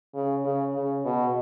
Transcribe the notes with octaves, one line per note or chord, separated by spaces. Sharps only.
C#3
C#3
C#3
B2